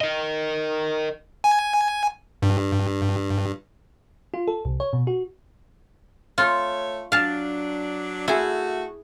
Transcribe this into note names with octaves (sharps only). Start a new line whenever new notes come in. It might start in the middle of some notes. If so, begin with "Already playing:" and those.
A#4 D#5
G#5
G2
F4
A4
C2
C#5
B2
F#4
A3 F4 C#5
F#3 D4 F5 A5
A3 E4 F#4 G#4